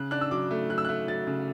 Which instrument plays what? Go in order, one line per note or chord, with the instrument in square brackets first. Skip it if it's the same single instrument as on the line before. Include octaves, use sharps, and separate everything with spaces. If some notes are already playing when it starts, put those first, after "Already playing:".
Already playing: [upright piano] C#3 F#6
D4 F#6
E6
F#3 D6
A3
F#3 F#6
E6
A3 F#6
F#3 A6
C#3